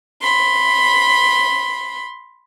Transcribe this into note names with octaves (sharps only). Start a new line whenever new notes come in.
B5 C6